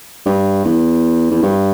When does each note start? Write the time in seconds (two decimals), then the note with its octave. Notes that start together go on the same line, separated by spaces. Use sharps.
0.26 G2
0.65 E2
1.32 E2
1.42 G2